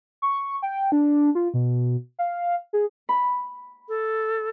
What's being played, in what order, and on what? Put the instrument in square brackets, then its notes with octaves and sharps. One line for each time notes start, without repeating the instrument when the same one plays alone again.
[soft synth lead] C#6
G5
D4
F4
B2
F5
G#4
[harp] B5
[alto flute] A4